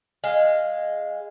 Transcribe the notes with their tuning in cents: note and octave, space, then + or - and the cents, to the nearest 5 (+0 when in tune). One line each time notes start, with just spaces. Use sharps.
G#3 -10 F5 +0